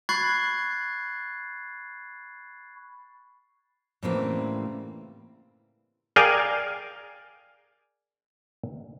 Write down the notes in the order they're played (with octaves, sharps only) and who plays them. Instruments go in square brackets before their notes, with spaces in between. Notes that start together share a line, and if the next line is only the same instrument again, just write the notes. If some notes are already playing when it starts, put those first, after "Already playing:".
[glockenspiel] B5 C#6 F#6 G#6 A6 C7
[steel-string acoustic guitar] A2 C#3 E3 G3 A#3 C4
[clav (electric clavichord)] G#4 A#4 D5 F5 G5 G#5